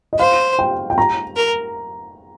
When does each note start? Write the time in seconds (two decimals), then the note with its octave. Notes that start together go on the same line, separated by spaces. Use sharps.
0.13 D#5
0.19 C5 F5
0.59 G5
0.90 G5
0.98 A#5
1.37 A#4